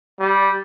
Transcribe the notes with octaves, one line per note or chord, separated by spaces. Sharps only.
G3